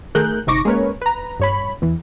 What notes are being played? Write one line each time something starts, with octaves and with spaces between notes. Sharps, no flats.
D#3 A3 G#4 A#4 F#6 G6
G1 C3 D#4 C#6 D6 A#6
G#3 A#3 C#4 A#4 B4 C#5
B4 A#5
G2 C#5 B5
E2 E3